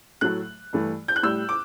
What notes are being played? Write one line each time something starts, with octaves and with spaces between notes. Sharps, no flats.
A2 F#3 A3 F#6
G2 E3 A3
G6
F#6
A2 G3 E6
D6